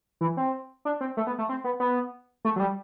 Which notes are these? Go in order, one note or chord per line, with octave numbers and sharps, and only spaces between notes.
E3
C4
D4
C4
A3
B3
A3
C4
B3
B3
A3
F#3
G3